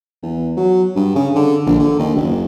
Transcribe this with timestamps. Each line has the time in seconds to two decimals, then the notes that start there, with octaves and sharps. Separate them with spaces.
0.23 E2
0.57 F#3
0.95 G2
1.15 C#3
1.35 D3
1.66 A#1
1.79 D3
1.99 D#2
2.16 F#1